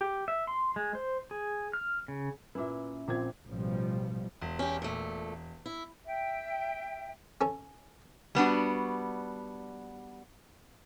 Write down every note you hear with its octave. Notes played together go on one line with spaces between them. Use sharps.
G4
E5
C6
G#3
C5
G#4
F6
C#3
A#2 C#4 E4 B4 E5
A#1 A#2 C4 G#6
A1 B2 F3 G3
E1
C#4 G4
A#2 A3
E4
E5 G5
C#4 A4 C#5
G3 B3 D4 F#4